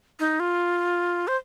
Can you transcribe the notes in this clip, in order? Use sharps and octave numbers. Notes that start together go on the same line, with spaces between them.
D#4
F4
C5